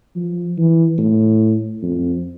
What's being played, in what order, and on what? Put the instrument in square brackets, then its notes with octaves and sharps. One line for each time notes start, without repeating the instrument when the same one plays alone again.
[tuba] F3
E3
A2
F2